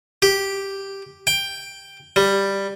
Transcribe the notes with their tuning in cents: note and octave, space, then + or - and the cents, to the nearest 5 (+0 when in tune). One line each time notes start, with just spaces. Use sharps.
G4 +0
G5 +5
G3 +5